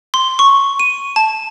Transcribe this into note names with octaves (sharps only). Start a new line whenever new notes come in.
C6
C#6
D#7
A5